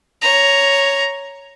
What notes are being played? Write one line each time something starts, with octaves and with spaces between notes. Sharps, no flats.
C#5 A#5